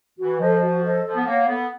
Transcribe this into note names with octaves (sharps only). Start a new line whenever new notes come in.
E3 F#4
F3 A4 C5 D#5
F#4
A4 C5 D#5
F3 A4
B3
A#3 C#5 F#5
B3 A4